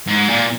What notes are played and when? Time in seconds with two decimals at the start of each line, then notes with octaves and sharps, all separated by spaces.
0.07 G#2
0.28 A#2